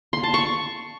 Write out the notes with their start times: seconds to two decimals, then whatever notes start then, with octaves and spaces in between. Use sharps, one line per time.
0.13 C6
0.23 A5
0.34 C#6